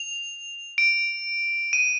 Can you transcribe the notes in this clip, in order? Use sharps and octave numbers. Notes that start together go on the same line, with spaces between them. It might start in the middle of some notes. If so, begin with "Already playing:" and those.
Already playing: F7
D7
D#7